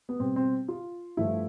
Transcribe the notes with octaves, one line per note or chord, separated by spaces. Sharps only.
B3
B2 G3 C4
C4
F4
G2 F3 A3 E4